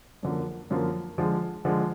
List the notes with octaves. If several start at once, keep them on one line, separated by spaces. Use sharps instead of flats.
F#2 D3 F3 A#3
F#2 D3 F3 A#3
D3 F3 G#3
D3 F3 G#3